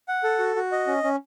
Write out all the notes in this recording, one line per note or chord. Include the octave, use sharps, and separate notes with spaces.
F#5
A4
F#4
F#4
D#5
C#4
C#4